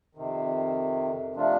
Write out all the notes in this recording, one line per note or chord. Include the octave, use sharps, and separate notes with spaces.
F2 C3 D#3
C3 F3 A3 D4 F4